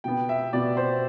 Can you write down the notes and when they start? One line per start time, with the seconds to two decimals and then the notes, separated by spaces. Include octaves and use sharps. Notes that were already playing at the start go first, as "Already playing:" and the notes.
0.04 B2 B3 G5
0.29 E5
0.53 B2 B3 D5
0.77 C5